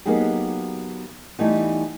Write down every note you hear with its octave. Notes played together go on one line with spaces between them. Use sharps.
F#3 A#3 B3 D#4 G4 G#4
E3 G3 A3 B3 D#4